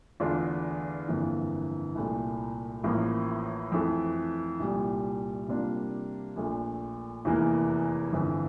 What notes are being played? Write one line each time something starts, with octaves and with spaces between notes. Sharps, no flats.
E2 D3 A3 D4 F4
G1 F2 E3 A#3
C2 A#2 A3
A1 A2 F3 A#3
F2 E3 A3
C2 A#2 G3
C3 G3 A#3 D4 F4
A#1 A#2 A3
F1 E2 E3 A#3
G1 F2 E3